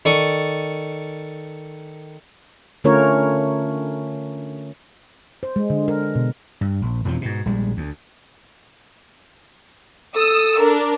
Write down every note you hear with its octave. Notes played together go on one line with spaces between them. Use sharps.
D#3 A4 D5 C#6 D#6
D3 A3 C#4 F4 A#4 C#5
C5
G#3
D3
A#4
B2
G2
A#1
E1 F2 E3 F3
G#2 B2
A#1 G3 G#3
D2
A4 D#6 E6
D4 A#4